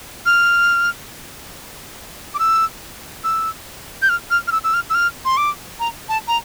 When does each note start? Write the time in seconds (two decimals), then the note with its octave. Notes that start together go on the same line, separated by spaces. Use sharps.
0.26 F6
2.34 D6
2.39 E6
3.24 E6
4.02 G6
4.09 F6
4.31 F6
4.48 F6
4.52 E6
4.64 E6
4.74 F6
4.90 E6
4.95 F6
5.25 C6
5.37 D6
5.80 A#5
6.09 A5
6.28 A#5